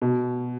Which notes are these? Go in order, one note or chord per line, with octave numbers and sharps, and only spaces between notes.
B2